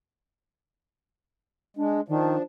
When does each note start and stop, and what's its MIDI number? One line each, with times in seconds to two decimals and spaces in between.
1.77 2.01 56
1.77 2.01 62
2.08 2.36 51
2.08 2.42 53
2.08 2.42 62